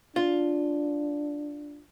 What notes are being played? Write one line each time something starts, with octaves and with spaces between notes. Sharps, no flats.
D4 F4